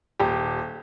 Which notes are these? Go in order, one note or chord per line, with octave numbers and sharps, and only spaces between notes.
D#1 G4